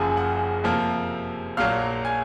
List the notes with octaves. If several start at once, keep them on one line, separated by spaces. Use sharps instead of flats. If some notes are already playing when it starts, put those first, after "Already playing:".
Already playing: F#1 F#2 C#3 F3 G#4 G#5
F#5
F2 C3 F3 A#3
A#1 A#2 F#3 A#3 F5 F6
G#5 G#6